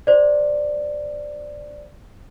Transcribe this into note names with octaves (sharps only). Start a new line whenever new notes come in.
C5 D5